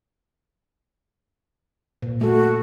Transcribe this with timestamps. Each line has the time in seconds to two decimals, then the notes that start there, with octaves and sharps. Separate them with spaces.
2.02 A#2
2.21 A3 F#4 A4